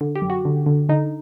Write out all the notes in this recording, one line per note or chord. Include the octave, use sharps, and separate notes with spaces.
D3
G4
F#2
F#4
D3
D3
D3 D#4